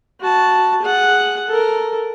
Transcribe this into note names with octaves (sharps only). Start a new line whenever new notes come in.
F#4 A5
G#4 F#5
A4 A#4